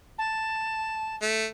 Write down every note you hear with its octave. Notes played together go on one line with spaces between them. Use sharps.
A5
A3